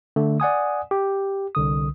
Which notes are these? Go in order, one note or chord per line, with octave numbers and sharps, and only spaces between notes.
D3 A3
D5 F#5 G#5 D#6
G4
C2 D3 D#6